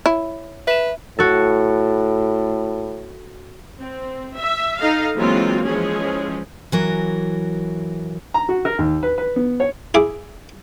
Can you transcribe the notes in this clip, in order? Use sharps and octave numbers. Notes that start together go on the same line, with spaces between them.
E4 C#5
B4 E5 E7
A2 F#4 A4
C4
E5
D#4 A4 D#5 F5
E3 F#3 G#3 A#3 C4 F4
E3 F3 G#3 C#4 G#4
E3 F#3 A#4
A#5
F#4
A#4
D#2
B4
B4
B3
C#5
E4 G#4 D6